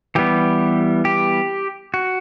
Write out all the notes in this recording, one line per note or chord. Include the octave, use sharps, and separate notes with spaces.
E3 G3 B3 G4
G4
F#4